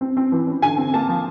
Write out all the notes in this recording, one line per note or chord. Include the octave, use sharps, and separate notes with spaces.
C4
C4
E3
C#4
D3 G#5
C4
A#3 A5
F3